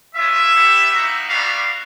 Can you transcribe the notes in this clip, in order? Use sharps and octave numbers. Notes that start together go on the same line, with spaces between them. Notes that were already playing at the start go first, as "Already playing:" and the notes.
G#3 C#4 F4 E5
B3 E4 G4
A#3 D#4 F#4
G3 B3 D4 F#4 F5